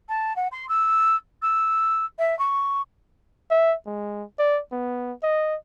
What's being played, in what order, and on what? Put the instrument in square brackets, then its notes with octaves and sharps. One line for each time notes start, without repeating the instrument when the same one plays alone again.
[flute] A5
F#5
C6
E6
E6
E5
C#6
[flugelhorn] E5
G#3
D5
B3
D#5